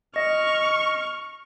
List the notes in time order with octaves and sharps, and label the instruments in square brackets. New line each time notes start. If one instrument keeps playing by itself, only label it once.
[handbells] D#5 [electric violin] C#6 F6